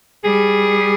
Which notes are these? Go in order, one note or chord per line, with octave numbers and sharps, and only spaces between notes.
G3 G#4